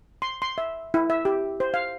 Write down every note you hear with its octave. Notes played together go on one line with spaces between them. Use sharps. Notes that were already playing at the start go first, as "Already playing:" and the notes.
C6
C6
E5
E4
E5
G4
C5
F5